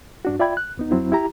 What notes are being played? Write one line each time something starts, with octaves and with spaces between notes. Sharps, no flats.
G2 D4 F#4
F4 D5 E5 G5 B5 G#6
F#6
D2 B3 D#4
F2 F#3 C4 E4
E4 G4 A#5